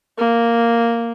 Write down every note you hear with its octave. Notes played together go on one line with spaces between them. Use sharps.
A#3